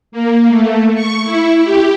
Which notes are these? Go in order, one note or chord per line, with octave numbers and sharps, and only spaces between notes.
A#3
A3
C#6
E4
G4